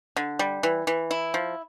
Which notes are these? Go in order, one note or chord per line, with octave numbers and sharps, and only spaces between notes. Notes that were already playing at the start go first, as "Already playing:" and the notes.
D3
G3
E3
E3
E4
F3